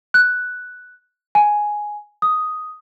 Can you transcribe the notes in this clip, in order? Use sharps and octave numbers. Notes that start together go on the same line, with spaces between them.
F#6
G#5
D#6